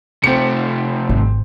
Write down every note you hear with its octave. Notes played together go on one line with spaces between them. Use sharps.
C3 A3 C4 C#7
G#1